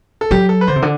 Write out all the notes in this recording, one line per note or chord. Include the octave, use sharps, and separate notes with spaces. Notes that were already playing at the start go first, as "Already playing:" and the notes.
A4
F#3 G4
A4
B4
D3 C5
C3
D3